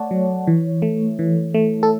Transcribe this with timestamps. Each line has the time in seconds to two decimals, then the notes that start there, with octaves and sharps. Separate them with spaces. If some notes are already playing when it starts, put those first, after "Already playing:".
Already playing: A3 C#5 D5 F#5 A5
0.11 F#3
0.47 E3
0.82 A3
1.19 E3
1.54 A3
1.83 A4